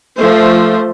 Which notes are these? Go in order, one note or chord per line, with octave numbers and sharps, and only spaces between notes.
F3 A3 C5